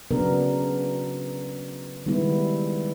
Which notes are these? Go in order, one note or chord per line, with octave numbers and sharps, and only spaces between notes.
C#3 F#3 B3 D4 A#4
D#3 G3 G#3 B3 E4